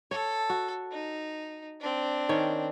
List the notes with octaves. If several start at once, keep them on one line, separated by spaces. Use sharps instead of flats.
A4 C#5
F#4
D#4
C4 D4
D#3 C#4 C#5